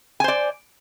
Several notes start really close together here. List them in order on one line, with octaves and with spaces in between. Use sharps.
G#5 C5 D5